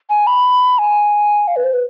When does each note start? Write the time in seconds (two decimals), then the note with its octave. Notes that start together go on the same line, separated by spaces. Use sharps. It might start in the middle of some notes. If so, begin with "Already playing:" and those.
0.10 G#5
0.27 B5
0.78 G#5
1.48 F5
1.56 B4
1.64 C5
1.74 B4